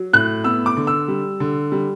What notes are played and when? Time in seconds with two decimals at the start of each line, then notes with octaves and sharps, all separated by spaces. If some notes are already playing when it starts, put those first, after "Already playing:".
Already playing: F#3
0.13 A2 F#6
0.44 B3 E6
0.66 D6
0.77 D3
0.87 E6
1.08 G3
1.40 D3
1.72 G3